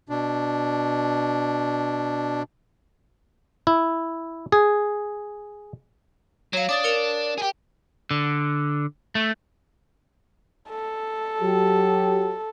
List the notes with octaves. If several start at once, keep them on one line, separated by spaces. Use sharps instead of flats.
B2 D4
E4
G#4
F#3 C#5 F5
D4 D6 D#6 A6
A#4 C#7 F7
G4 G#4
D3
A3
A4
F#3 G4